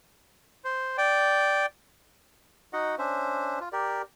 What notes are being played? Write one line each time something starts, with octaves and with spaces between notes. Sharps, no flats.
C5
D5 G5
D#4 F#4 D#5 F#5
C#4 D4 C5 E5
F4
G4 A#4 D5